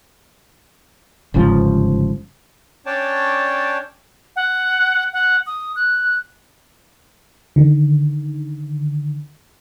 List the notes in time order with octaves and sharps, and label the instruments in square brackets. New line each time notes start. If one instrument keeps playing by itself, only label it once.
[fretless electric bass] G1 G#2 C#3 F3
[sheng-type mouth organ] C#4 D4 C#5 D5 G5 A5
[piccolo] F#5
F#5
D#6
F#6
[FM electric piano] D3 D#3